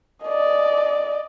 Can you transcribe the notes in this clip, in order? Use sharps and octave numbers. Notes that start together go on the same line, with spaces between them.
D5 D#5